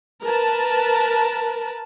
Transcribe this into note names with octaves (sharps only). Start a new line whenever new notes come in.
A#4 B4 A5